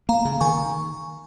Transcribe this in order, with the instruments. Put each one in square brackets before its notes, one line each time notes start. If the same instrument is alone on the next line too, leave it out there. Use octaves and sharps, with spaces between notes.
[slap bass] A#3 [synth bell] F5 A#5
[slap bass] C#3
[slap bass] D#3 [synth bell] G#5 C#6